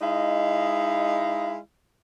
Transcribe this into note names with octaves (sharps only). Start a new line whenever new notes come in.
G#3 D#4 E4 D#5 F5